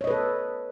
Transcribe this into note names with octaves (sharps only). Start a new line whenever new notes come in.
A4 B4 C#5 D#5